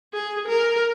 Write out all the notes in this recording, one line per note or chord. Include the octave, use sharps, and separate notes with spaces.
G#4
A#4